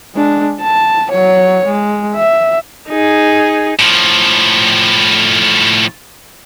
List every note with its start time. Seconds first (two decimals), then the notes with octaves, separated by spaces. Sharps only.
0.15 G#3 D4
0.61 A5
1.12 F#3 C#5
1.66 G#3
2.15 E5
2.89 D#4 G#4
3.79 A2 F3